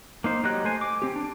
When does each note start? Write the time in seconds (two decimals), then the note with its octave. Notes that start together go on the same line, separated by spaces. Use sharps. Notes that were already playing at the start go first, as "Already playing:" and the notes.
0.24 A#3 D#4 C5
0.44 F#3 D#4 G4 D#5 F#6
0.64 A3 C5 G#5
0.81 D6
1.02 C4 G4
1.16 D4